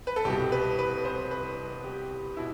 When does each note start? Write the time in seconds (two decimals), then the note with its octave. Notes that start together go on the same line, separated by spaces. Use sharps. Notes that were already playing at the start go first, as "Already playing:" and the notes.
0.07 B4
0.16 A4
0.25 C2 B2 G4
0.52 B4
0.79 B4
1.05 C5
1.31 B4
1.84 G4
2.37 B2 E4